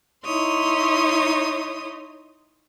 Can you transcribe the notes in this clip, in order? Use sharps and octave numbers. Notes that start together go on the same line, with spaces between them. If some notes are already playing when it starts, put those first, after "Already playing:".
D#4 E4 C#5 C6 D#6